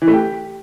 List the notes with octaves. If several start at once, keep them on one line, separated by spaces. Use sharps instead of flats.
E3
A3
G4